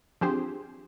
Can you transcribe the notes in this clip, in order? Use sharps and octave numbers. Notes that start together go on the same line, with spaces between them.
D3 F3 C4 G4 G#4 C5